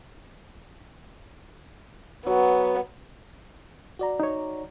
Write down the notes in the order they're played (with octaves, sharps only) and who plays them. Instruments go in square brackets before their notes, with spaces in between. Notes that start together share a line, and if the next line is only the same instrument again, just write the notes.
[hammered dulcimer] F#3 [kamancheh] B3
[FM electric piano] F#4 D5 A#5
[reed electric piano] D#4 C#5